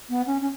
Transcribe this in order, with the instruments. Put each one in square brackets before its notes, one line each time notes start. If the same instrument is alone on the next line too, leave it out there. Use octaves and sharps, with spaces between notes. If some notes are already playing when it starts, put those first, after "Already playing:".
[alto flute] B3
C#4
C#4